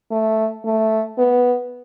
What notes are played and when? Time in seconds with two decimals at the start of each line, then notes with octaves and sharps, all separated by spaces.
0.11 A3
0.64 A3
1.18 B3